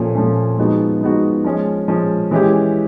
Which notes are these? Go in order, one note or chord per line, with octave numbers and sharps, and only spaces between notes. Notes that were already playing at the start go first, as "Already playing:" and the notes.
Already playing: A#2 F3 A3 C#4
A#2 F3 A3 C#4
F3 G#3 B3 D#4 F#4
F3 G#3 B3 D#4 F#4
F3 G#3 C#4
F3 G#3 C#4
E3 G#3 C#4 E4 G4